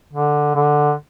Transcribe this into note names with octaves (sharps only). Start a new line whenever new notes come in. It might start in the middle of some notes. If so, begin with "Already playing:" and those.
D3
D3